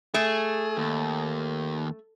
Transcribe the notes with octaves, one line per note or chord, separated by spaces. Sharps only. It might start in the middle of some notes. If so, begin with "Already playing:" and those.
A3 G#4
D#2